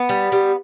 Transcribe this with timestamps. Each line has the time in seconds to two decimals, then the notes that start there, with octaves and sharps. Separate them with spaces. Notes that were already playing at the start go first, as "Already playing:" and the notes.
Already playing: B3
0.09 G3
0.32 G3